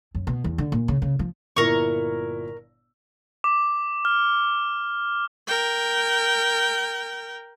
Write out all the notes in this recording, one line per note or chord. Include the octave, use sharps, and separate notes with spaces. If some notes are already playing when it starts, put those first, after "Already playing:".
F#2
B2
E2
D3
A#2
C#3
C#3
F3
G1 A#2 E4 A#4 C#6
D6
F6
A#4 G5